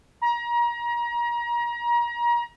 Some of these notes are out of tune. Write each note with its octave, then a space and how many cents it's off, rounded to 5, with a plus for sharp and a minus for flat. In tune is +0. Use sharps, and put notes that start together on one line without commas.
A#5 +30